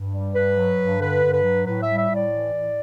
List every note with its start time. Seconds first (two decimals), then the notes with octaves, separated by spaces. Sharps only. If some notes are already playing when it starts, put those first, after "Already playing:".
Already playing: G2
0.13 G3
0.35 G2 B4
0.57 F#3
0.79 G2
1.00 D3 B4
1.22 G2
1.32 B4
1.43 F#3
1.65 A2 B4
1.82 E5
1.87 G3
1.97 E5
2.09 A2
2.14 D5
2.31 E3
2.52 A2